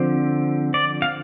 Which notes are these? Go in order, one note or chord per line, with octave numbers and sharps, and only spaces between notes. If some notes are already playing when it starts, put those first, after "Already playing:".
Already playing: D3 F3 C4
D5
F5